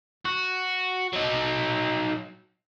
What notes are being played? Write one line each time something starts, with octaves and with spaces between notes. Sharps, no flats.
F#4
F#3 D#4